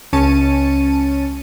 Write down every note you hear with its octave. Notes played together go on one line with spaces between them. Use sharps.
C#2 C#4 A5 C#7 D#7